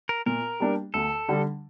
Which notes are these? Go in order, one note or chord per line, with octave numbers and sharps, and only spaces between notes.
A#4
A#2 A#4
G3 A#3 D4 G4
D2 A4
D3 G3 D4